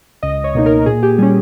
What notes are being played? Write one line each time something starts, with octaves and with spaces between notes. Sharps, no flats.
C#2 D#5
C#5
B2 A#3 D#4
A#4
A#2 G#4
G4
G3 C#4 G#4